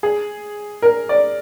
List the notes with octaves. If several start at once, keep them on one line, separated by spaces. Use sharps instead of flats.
G#4
A#4
D5